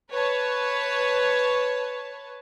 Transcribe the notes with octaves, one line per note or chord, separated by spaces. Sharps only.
B4 C#5 A5